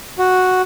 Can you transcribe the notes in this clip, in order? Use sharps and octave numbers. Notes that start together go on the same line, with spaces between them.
F#4